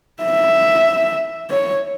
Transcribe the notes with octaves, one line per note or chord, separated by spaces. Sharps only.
E5
C#5